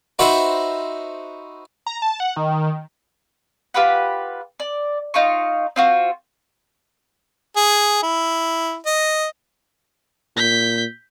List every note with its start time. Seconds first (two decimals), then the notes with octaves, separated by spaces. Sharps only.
0.19 D#4 F#4 B4 C5 D#5 E5
1.86 A#5
2.02 A5
2.20 F#5
2.36 D#3
3.74 F4 G4 B4 F#5
4.60 D5
5.14 D#4 F4 A#5 C#6
5.76 C4 F4 F#4
7.56 G#4
8.03 E4
8.86 D#5
10.36 A#2 G6 B6